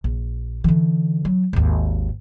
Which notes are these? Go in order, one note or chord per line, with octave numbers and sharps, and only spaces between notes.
A#1
D3 E3
F#3
G#1 D#2